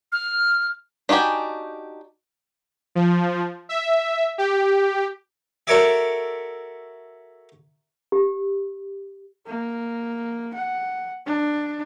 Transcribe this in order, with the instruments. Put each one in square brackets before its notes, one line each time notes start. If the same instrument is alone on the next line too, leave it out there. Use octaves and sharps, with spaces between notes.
[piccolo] F6
[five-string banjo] D4 D#4 F#4 G4 G#5
[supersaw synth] F3
E5
G4
[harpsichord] F#4 A4 A#4 C#5 D5 E5
[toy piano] G4
[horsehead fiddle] A#3
F#5
D4